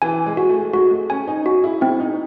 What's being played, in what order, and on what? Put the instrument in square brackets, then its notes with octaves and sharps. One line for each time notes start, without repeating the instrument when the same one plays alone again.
[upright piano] E3 [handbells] G#5
[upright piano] G#3
[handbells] F#4
[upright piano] A3
[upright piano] G#3 [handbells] F#4
[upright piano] A3
[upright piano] C#4 [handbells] G#5
[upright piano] D#4
[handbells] F#4
[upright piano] E4
[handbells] C4 [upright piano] E4
[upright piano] D#4